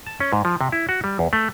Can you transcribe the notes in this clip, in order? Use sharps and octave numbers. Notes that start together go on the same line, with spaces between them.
A5
C#4
G#2
F3
C3
E4
F#4
G3
E2
A3